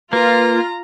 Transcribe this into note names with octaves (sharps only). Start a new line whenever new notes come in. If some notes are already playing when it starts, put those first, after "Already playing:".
A#3 F4 B4 A#5